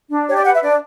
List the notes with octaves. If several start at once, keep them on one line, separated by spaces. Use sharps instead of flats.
D4
G4 C#5
D5
B4 F#5
E5
D4 D5